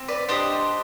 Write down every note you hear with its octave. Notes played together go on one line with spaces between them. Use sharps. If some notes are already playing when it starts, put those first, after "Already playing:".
Already playing: C4
B4 D5
D4 G4 C5 D#5